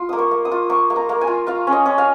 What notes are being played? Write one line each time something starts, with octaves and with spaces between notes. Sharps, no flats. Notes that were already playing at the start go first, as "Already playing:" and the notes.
Already playing: F4
A#3 D#6
C#6
A#3
D#6
F4
A#3 C#6
A#3
A#5
A#3
G#5
F4
F4 F5
C#4
D#5
C#4
F5